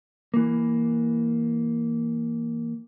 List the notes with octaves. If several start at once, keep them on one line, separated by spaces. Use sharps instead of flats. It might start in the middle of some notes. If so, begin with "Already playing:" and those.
E3 A#3